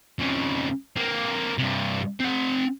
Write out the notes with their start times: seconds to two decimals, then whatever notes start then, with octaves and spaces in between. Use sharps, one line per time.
0.19 F2 C#3
0.97 A#3 C4
1.58 G2 C3
2.20 C4 F#5